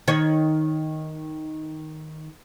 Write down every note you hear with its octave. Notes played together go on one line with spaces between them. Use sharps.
D#3 C#5